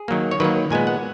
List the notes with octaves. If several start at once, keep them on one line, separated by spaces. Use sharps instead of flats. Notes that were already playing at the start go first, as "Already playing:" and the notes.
Already playing: G#4
D#3 F#3 A#3
C#5
D#3 F#3 A#3 B4
A#2 G#3 B3 G#5
F#5